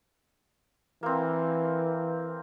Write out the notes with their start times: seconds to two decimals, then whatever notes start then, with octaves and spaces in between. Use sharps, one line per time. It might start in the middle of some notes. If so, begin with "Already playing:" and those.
1.03 E3 A#3 C4